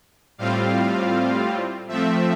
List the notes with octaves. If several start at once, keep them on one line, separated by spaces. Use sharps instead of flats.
A2 G3 C4 F4 F5
F3 A3 C4 E5